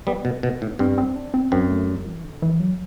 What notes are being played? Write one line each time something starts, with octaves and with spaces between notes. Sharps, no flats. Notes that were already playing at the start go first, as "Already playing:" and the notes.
G3 B3
B2
B2
A2
G2 C4
C4
D4
C4
F#2 C4
A3
G3
E3
D3
E3
F#3